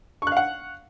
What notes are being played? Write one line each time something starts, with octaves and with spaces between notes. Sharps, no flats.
F5 F#5 C#6 F#6